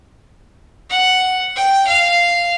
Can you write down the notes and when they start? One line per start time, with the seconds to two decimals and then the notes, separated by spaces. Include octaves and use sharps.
0.90 F#5
1.56 G5
1.87 F5